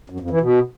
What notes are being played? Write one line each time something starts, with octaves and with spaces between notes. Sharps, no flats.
F#2
F2
E3
B2